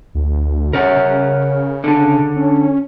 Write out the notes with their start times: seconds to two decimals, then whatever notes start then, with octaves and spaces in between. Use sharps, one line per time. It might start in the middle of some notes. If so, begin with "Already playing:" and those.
0.15 D2
0.73 C#3 A#4 C#5 F#5
0.96 C#3
1.84 D3 D4
2.36 C#4